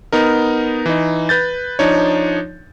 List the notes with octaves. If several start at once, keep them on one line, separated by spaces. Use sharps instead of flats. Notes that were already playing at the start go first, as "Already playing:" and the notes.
B3 D#4 A#4
E3 D#4
B4 G6 A6
F3 D4 D#4 C#5